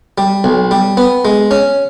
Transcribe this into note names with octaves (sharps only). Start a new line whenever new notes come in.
G3
B1
G3
B3
G#3
C#4